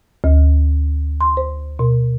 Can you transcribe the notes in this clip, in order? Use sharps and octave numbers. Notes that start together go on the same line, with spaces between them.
D2
C6
C5
B2